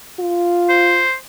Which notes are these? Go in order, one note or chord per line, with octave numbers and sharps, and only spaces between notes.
F4
C5